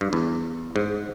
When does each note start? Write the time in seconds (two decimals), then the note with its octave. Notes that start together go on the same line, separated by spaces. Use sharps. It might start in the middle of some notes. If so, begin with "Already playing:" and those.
0.01 G2
0.13 E2
0.76 G#2